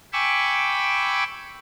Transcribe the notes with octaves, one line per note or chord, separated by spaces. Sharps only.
G5 G#5 B5 C#6 D6 E6